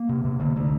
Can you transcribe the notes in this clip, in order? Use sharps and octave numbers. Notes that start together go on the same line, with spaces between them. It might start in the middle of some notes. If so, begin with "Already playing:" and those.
Already playing: A#3
C3
C3
D3 A#3
D3 A3